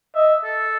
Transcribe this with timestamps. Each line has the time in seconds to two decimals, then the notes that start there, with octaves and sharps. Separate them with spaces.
0.15 D#5 E5
0.45 A4